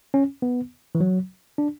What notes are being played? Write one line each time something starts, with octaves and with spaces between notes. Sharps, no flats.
C#4
B3
E3
F#3
D4